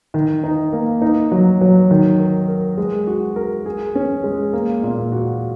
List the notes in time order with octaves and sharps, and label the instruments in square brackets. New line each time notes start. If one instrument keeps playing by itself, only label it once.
[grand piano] D#3
D#4
A#3
D#4
F#3
F#3
D#3
A#4
A#4
G#3
F#4
A#4
G#4
C#4
G#3
A#3
A#2
F#4